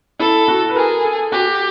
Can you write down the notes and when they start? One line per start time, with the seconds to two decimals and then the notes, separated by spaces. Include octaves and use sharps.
0.19 E4 A4
0.48 F#4
0.69 B4
0.76 G#4 A#4
1.04 A4
1.32 F#4 G4